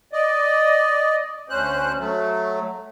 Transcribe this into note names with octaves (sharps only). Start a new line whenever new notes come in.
D5 D#5
D2 C#4 C5 F#6
F#3 A3